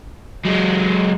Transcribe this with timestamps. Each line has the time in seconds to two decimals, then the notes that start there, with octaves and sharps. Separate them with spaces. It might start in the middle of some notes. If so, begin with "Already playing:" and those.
0.45 F#3 G#3